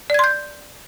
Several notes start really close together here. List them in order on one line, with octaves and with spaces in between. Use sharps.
D5 G#6 C6 G6